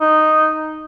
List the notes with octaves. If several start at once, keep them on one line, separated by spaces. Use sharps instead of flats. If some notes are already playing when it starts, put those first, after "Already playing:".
D#4